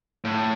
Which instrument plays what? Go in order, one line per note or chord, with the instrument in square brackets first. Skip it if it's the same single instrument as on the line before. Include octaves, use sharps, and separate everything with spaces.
[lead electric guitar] A2